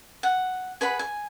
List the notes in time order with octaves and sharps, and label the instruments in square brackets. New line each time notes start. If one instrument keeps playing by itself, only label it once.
[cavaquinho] F#5
G#4 B4 F#5 B5
G#5